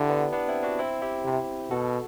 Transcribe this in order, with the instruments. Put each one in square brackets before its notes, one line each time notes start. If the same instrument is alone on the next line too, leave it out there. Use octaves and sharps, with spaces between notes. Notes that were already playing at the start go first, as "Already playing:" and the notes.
Already playing: [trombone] D3 [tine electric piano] E4 G4
[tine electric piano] B3 D4
B3 D4
C4 E4
D4 F#4
C4 E4
E4 G4
[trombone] C3
[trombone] B2 [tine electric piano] F#4 A4